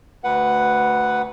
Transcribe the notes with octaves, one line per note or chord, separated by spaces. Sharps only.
D2 B4 F#5